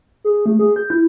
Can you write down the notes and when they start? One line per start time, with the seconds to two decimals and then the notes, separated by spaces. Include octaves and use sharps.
0.24 G#4
0.46 A3
0.59 G#4
0.76 G6
0.90 E4